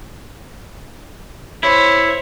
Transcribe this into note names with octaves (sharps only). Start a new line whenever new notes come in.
E4 C5 C#5